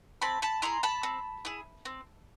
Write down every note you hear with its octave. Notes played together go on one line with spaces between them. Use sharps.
C4 A5 B5
A5 B5
E4 G#4 A#5 C6
A5 B5
C4
E4 G#4
C4